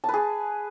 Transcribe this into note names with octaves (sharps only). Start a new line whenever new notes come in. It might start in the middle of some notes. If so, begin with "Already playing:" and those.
A5
B4
G#4